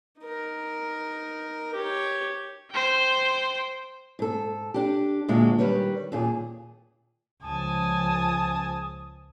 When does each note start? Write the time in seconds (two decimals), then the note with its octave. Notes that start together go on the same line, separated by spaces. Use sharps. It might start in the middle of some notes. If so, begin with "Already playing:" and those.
0.21 D#4 A#4
1.74 G4 C#5
2.71 C5 G5
4.19 G#2 A4
4.74 D4 G4
5.28 D2 A#2 G#3 F#4
5.58 D#3 G3 B4 C#5
6.12 D#2 A#2 G#4
7.44 C#2 F3 G#5 A5 D#6